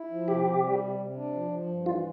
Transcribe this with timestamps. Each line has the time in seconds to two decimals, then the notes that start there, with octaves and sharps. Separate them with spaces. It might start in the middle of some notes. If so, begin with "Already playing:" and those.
Already playing: E4
0.11 F3
0.28 C3 G4
0.46 C3
0.64 G3
0.81 C3
0.99 C3
1.16 D4
1.34 F3
1.51 F3
1.69 G2
1.86 E3 F4